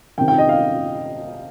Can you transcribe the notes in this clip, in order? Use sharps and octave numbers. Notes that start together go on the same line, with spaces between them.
C3 D#3 G5
G5
D#5
F5